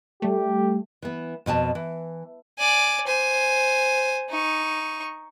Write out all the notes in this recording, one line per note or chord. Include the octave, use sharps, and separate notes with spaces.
G3 A3 G4
E3 B3
F2 B2 G#5 A5
E3
D5 G#5
C5 G#5
D#4 C#6